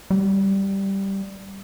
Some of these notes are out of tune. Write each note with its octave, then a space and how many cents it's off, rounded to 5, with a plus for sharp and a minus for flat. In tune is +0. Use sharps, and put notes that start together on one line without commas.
G3 -5